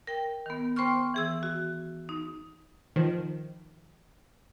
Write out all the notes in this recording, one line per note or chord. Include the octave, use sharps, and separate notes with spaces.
A#4 G5
D#3 B3
B3 C5 G5 C6 C#6 F6
E3 G#4 E6
F#4
D#4
D#3 F3